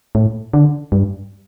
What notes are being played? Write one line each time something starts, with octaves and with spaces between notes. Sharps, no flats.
A2
D3
G2